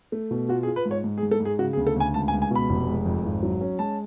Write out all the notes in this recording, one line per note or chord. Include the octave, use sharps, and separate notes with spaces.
A3
B2
F4 F#4
G#4
F4
B4
G#2
C#5
G#2
G#4
G#2
A4
G#2
G#4
C#3 F#4
G#4
D2
A4
D2 G#5
C#2 A5
G#5
C#2
G#5
B2 B5
F1
G#3
F2
G#1
F#3
C#4
G#3 A5